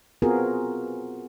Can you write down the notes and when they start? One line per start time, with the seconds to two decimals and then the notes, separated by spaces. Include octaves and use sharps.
0.22 B3 C4 F4 F#4 G#4 A#4